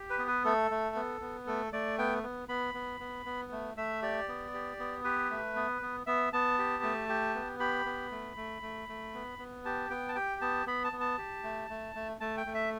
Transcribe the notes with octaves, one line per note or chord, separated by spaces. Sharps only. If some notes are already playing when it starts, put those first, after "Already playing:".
Already playing: G4
B4
B3
B4
A3 A4
A3
B3
B3
A3 A4
A3 D5
B3 G5
B3
B3 B5
B3
B3
B3
A3
A3 E5
G4 D5
B3
G4
B3
G4 B4
A3
B3
B3
B3 E5
B3 A5
G4
A3
G4
B3
G4 B5
B3
A3
A3
A3
A3
B3
B3
G4 A5
B3 G5
A5
G4 G5
B3 A5
B3 B5
A5
B3
A5
G4
A3
A3
A3
A3 A5
G5
A3
E5